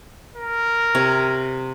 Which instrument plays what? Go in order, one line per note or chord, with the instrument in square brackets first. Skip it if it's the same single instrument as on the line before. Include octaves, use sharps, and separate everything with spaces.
[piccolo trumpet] A#4
[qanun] C3 C#5